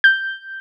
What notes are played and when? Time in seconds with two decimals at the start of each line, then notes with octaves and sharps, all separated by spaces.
0.04 G6